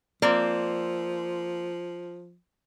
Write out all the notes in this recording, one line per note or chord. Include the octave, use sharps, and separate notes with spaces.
F3 A#3 C4 D5